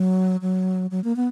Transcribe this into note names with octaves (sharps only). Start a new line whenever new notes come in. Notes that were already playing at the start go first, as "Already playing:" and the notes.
Already playing: F#3
F#3
F#3
A#3
B3